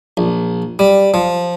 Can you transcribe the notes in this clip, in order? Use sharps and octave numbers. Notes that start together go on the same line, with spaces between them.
A#1
G3
F3